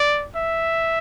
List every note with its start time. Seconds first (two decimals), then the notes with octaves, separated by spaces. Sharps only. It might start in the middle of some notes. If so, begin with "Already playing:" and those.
Already playing: D5
0.36 E5